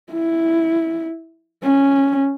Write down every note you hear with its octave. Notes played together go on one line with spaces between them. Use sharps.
E4
C#4